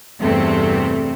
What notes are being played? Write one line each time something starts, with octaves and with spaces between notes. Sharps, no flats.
E2 G2 C3 A3 C4